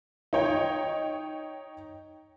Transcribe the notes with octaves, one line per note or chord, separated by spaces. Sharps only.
D#4 C#5 G5